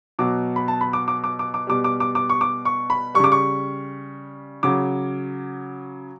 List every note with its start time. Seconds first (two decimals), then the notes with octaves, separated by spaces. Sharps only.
0.19 B2 F#3 D6
0.56 B5
0.68 A5
0.81 B5
0.93 D6
1.08 D6
1.24 D6
1.39 D6
1.54 D6
1.67 B2 G3 D6
1.84 D6
2.00 D6
2.15 D6
2.30 C#6
2.41 D6
2.65 C#6
2.90 B5
3.14 G3 C#6
3.19 C#3 D6
3.32 C#6
4.63 C#3 F#3 D6